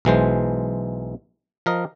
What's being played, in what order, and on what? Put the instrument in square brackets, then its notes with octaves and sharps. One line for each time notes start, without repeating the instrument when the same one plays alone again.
[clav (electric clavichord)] B1 E3 G#3 C5
F3 A#4 D#5